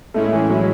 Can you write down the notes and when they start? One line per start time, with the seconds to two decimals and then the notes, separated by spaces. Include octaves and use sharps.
0.14 A2 G#3 A3 C#4 E4
0.32 E3
0.49 F#3